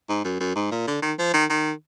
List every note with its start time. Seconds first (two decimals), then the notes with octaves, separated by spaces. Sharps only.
0.09 G#2
0.24 F#2
0.40 F#2
0.56 G#2
0.71 A#2
0.88 D3
1.02 D#3
1.18 F3
1.34 D#3
1.49 D#3